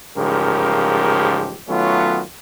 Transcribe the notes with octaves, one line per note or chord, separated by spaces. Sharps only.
A1 G#2 C#3 F3 G4 A#4
D#3 F#3 A3 B3 C#4 F4